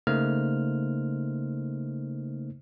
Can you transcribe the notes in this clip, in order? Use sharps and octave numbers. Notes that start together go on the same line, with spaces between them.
C#3 A3 A#3 D#4 C5 F6